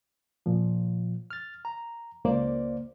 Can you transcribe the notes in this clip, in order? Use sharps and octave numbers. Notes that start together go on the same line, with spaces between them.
A#2 F3
F6 A6
A#5
C#2 A#3 C5 D5